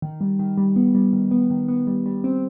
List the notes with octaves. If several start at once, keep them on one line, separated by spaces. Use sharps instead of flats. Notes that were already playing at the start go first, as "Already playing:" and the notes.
D#3
G3
D#3
G3
B3
G3
D#3
B3
D#3
B3
G3
G3
C4